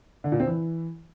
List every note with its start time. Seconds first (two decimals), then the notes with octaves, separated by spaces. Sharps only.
0.24 D3
0.32 A#2
0.40 C4
0.47 E3